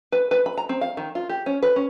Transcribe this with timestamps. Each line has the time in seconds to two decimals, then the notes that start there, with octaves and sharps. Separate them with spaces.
0.12 B4
0.31 B4
0.46 B5
0.58 A#5
0.69 C4
0.81 F5
0.97 D#3
1.15 F4
1.29 G4
1.46 C#4
1.63 B4
1.76 C#4